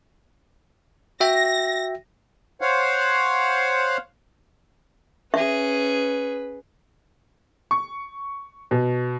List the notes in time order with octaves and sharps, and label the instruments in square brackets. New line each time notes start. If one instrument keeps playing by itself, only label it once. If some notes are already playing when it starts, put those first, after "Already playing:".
[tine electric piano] F#4 E5 G5 [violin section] A#6
[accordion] C5 C#5 F5 F#5
[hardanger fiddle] C#4 G#4 [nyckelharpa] B4 [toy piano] E5
[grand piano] C#6
B2